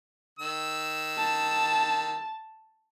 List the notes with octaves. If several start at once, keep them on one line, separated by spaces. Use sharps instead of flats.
D#3 E6
A5